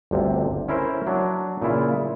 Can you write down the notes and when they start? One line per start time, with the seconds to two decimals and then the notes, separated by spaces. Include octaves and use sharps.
0.11 G1 D2 C3
0.68 C#4 E4 A#4 C5
1.07 F#3 D4
1.62 A#2 C#3 E4 F4